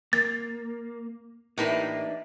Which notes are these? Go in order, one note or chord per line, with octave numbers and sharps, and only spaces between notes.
A#3 A6
A2 E3 A#3 D4 D#4 G4 A#4 B4